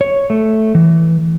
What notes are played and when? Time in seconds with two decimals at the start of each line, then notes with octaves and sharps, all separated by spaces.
0.01 C#5
0.30 A3
0.75 E3